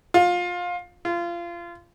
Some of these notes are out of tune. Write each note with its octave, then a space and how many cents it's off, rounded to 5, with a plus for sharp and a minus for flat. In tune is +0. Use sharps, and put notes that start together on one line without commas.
F4 +20
F4 -25